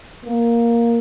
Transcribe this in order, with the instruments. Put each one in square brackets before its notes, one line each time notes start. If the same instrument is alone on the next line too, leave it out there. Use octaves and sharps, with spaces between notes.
[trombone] A#3